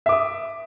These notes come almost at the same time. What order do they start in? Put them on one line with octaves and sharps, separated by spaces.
E5 D6 D#6